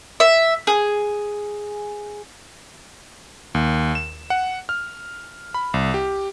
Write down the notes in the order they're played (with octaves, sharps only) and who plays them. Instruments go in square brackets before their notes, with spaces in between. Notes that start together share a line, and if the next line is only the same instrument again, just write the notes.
[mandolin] E5
G#4
[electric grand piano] D#2
E7
F#5
F6
B5
C2
G4